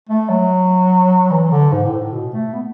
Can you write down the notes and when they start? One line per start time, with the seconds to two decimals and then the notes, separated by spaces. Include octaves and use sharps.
0.09 A3
0.29 F#3
1.31 E3
1.51 D3
1.72 G#2
1.85 A2
1.99 A2
2.12 B2
2.33 A3
2.53 B3